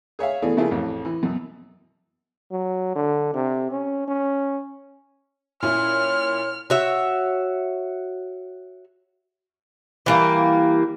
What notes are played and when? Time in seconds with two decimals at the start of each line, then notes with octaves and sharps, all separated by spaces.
0.19 G#4 C#5 E5 F5
0.42 B2 E3 A3 G#4 D5
0.57 C#3 F3 A#3 E4 F4 G#4
0.71 A1 F2
1.05 E3
1.23 F#2 B2
2.52 F#3
2.96 D3
3.34 C3
3.71 C#4
4.08 C#4
5.62 A#2 C#4 E4 C#5 F6
6.70 F#4 C#5 E5
10.06 E3 G3 A#3